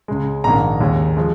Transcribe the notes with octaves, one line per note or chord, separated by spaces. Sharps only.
C#2 C#3 G#3
A#1 G#2 D#3 A#3 A#5
D#2 C#3 G#3
F3 G#3